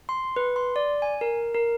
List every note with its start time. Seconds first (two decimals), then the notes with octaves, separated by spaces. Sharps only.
0.09 C6
0.36 B4
0.56 C6
0.76 D5
1.02 G#5
1.21 A#4
1.55 A#4